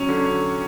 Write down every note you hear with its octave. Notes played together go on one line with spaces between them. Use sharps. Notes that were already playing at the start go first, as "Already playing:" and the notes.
Already playing: F#3 C#4
D3